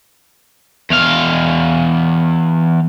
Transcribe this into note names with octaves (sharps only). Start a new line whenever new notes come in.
E2 F5